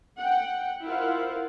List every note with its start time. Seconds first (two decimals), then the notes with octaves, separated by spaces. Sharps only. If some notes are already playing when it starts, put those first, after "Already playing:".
0.18 F#5 G5
0.83 E4 F4 A#4 C5 F5 F#5